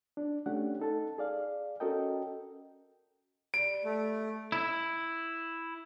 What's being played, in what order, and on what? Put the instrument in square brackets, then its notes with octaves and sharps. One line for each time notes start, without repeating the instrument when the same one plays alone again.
[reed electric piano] D4
A3 C#4 D4 G4 F#5
D#4 A4 A5
G#4 D5 F5
C#4 F#4 A4 A#4 D#5 G5
[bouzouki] G3 [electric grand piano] D7
[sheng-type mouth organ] A3
[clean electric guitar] E4